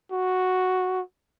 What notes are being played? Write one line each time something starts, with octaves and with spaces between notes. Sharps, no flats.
F#4